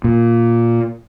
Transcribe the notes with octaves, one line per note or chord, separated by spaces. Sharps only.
A#2